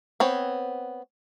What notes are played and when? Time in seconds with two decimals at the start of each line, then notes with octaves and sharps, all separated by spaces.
0.20 B3 C4 C#5